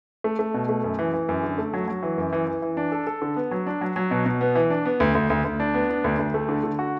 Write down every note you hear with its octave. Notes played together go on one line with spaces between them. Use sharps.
A3
A3
B2
A3
F#2
E3
E3
F#2
D3
A3
F#3
F#3
E3
F#2
E3
E3
E3
D4
A4
A4
D3
B3
F#3
D4
F#3
F#3
B2
B2
B3
E3
D4
B3
D2
D2
D2
D2
D4
B3
D4
D2
D2
A3
D3
D3
F#4